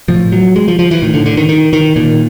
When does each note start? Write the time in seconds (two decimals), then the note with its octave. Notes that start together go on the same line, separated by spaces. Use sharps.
0.08 A2 F3
0.32 F#3
0.56 G#3
0.68 F3
0.79 F3
0.91 E3
1.02 A2 D#3
1.14 D3
1.26 D3
1.37 D#3
1.49 D#3
1.73 D#3
1.96 A#2 D#3